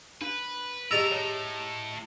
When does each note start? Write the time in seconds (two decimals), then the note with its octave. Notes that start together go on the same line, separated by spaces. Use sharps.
0.21 D4 B4
0.91 G2 E4 G4 G#4 D#5 A5 A#5 E6
1.12 A2 C#5